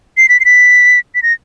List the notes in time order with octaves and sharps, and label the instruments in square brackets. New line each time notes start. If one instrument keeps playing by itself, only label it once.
[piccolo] C7
B6
C7
B6
B6
A#6